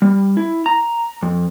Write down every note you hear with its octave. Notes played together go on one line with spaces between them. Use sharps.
G3
E4
A#5
F2